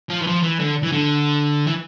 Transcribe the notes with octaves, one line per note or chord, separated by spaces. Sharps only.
F3
E3
F3
E3
D3
E3
D3
E3